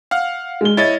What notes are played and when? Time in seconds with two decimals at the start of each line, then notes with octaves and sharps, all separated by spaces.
0.11 F5 F#5 F6
0.61 G#3 G7
0.77 E4 C#5 D#5 A6